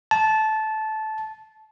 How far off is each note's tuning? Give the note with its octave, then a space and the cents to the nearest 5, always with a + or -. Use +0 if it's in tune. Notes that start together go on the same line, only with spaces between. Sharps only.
A5 -15